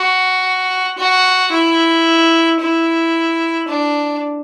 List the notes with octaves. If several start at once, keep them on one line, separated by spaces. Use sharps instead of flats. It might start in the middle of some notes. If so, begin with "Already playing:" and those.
Already playing: F#4
F#4
E4
E4
D4